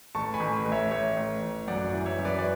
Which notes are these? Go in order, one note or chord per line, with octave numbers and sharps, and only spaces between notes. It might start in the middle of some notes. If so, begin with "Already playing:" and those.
A1 A5 C#6
G#5 B5
A1
A1
C#5 E5
A1 C#5 E5
A1
A1
F#2 D5 F#5
E3
C#5 E5
F#2
B4 D5
D5